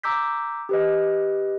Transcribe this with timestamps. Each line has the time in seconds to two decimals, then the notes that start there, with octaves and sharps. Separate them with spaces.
0.04 A#5 D6 E6 G6 B6
0.69 G4 B4 D#5